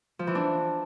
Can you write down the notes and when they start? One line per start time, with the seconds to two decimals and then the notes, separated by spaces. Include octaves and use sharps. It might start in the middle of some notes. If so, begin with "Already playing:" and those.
0.19 F3
0.27 E3
0.35 D4